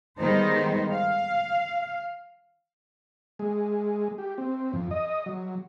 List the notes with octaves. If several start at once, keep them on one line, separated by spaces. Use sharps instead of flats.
D#3 G3 G#3 B3 D#4 C5
F5
G#3
G4
C4
F2
D#5
F#3